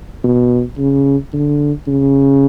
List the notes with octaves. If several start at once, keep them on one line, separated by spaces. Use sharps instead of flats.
B2
C#3
D3
C#3